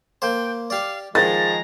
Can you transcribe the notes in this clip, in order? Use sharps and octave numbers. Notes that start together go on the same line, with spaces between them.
A#3 C5 G5
G4 D5 F5
D#3 F3 G#3 A#5 A6